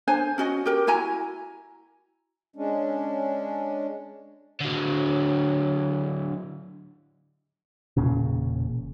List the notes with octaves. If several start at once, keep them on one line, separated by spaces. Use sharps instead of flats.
D4 C5 G#5
C#4 F#4 D#5
G4 A#4
E4 F#4 G#5 A#5
G#3 C#4 D4
D3 F#3
E1 A#2 C#3